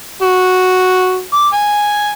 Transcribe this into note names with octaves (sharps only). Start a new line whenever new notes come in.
F#4
D6
G#5